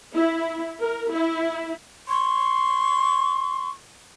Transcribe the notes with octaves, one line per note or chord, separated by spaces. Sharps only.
E4
A#4
E4
C6 C#6